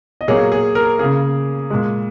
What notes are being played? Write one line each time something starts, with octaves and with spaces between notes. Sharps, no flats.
D#5
A#2 F#3 A#3 G#4 C#5
G#4
A#4
C#3 A#3 G#4
A#2 G#3